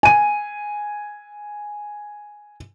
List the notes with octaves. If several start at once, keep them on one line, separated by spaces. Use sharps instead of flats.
G#5 D#7